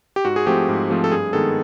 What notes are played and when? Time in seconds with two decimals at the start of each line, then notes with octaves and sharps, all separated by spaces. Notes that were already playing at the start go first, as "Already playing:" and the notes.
0.16 G4
0.25 G#2 F#4
0.36 G#4
0.47 F3 A3 C4 G4
0.69 G#2
0.90 F3 A3 C4
1.04 A4
1.12 G2 G#4
1.33 D#3 G#3 B3 A4